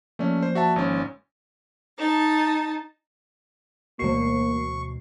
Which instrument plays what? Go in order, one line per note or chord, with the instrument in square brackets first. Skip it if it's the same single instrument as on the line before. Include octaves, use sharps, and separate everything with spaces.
[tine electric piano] F3 A#3 D5 [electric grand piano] A3 C#4
[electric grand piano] C5
F#4 E5 A5
G#1 C#4
[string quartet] D#4 A5
[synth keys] D2 B2 [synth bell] E3 C7 [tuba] A#3 [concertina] C#6